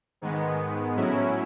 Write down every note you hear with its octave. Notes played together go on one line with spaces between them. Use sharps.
G#2 D#3 G#3 B3
A2 F#3 C#4 E4